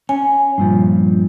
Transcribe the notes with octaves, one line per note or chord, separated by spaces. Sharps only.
C#4 G#5
G2 A#2 F3